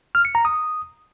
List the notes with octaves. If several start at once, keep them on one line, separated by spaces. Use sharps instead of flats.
F6
C#7
A#5
D#6